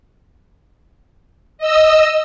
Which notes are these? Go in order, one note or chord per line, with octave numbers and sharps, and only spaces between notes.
D#5 E6